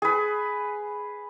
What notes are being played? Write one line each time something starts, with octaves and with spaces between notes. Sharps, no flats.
G#4 B4